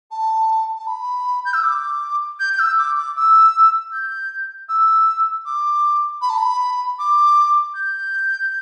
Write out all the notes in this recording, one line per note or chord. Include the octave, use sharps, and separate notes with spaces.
A5
A5
B5
G6
E6
D6
G6
G6
E6
D6
D6
E6
G6
E6
D6
B5
A5
B5
D6
G6